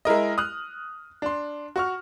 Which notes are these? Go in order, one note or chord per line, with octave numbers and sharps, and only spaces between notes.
G#3 E4 A#4 D#5
D#6 F6 F#6
D4 C6
F#4 C#6 F6